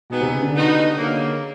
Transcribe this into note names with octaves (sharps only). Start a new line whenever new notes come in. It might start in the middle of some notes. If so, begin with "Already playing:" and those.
B2 D#3 G#3 B3
C3
C#3
D3
G3 B3 D#4 F#4
C#3 F#3 A#3